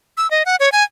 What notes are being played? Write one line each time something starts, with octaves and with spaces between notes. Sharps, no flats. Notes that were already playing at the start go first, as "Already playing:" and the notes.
E6
D#5
F#5
C#5
G#5